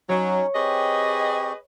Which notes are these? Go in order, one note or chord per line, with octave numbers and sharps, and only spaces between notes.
F#3 C#4 D#4 C#5
C4 G4 G#4 B4 D#5 C#6